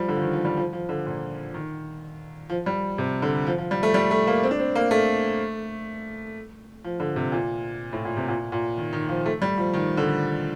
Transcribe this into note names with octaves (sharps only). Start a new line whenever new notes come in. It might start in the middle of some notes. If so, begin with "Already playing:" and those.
Already playing: F3 G3
D3
F3
D#3
F3
G3
F3
F3
D3
A#2
D#3
F3
G3
C3
D3
F3
F3
G3
A3
G3
A3
A#3
C4
D4
C4
A#3
A3
F3
D3
C3
A#2
A2
A#2
C3
A#2
A#2
D#3
D#3
F3
A3
G3
F3
D#3
D3